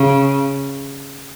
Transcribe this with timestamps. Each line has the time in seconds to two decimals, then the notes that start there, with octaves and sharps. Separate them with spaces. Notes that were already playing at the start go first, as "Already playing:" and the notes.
Already playing: C#3